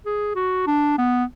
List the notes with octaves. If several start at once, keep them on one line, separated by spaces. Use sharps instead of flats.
G#4
F#4
D4
B3